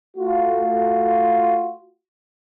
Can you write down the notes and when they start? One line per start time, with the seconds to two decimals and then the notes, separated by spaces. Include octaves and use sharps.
0.17 A3 F4 F#4